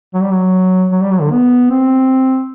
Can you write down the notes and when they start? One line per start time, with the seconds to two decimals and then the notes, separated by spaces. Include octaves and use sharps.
0.14 F#3
0.22 G3
0.31 F#3
0.92 F#3
1.01 G3
1.12 F#3
1.21 D3
1.31 B3
1.70 C4